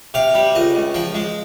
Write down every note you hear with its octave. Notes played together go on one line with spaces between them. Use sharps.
C3 F5
G3
C#2 D#5
C#2
F3 G5
G#3